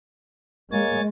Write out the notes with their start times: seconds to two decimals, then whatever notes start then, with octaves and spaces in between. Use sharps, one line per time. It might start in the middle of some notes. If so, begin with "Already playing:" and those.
0.72 G#3 A#3 C#5 G#5 A6